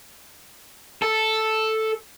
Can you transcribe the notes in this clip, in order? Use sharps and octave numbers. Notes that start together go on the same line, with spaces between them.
A4